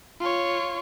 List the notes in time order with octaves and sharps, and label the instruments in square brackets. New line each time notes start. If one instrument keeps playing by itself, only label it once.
[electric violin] F4 C#5